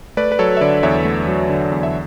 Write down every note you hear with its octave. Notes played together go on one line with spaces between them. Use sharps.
A3 B4 D5
B4
F#3 A4 C#5
E5
D3 B4 D5
E2 C#5 E5
A3
F#3
D3
E2
E5